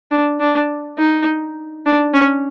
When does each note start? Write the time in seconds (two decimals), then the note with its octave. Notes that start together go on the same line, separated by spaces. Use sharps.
0.12 D4
0.40 D4
0.98 D#4
1.86 D4
2.14 C#4